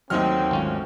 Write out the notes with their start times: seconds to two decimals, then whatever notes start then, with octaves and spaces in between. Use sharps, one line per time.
0.10 D#2 F#3 A3 C4 D#4 F6
0.51 G#1 C#4 F4